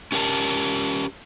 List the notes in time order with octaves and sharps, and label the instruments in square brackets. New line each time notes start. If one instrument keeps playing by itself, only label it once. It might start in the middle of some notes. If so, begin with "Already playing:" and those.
[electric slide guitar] C#4 G4 A#4 F#5 A5